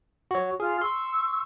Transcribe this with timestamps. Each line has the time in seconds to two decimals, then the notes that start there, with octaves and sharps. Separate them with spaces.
0.31 F#4 C#5
0.60 F4 G#4 F6
0.81 C6 C#6 E6